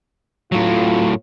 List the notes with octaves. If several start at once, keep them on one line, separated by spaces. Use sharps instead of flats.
A2 F#3 F4